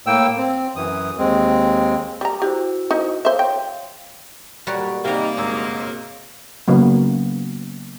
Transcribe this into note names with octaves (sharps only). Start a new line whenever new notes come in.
A2 A#3 G5 E6
C4
F#2 E3 D#6
D#2 G#3 C4
G3 A#5
E4 F#4 G4 C5
D#4
C5 C#5 E5 F5 C6
G5
B1 F#2 A#2 G3 F#4 A#4 C#5
C3 G3 A#3 D#4 G4
G1 G#2 F#4 G#4 A#4 C#5 E6
C#3 F#3 A#3 B3